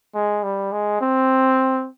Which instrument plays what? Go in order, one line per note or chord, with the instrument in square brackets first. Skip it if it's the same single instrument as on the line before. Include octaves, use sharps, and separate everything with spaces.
[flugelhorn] G#3
G3
G#3
C4